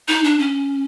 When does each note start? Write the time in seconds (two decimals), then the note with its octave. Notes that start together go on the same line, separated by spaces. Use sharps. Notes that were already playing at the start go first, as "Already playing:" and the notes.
0.08 D#4
0.24 D4
0.39 C#4